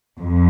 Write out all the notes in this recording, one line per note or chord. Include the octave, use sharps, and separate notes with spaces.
F2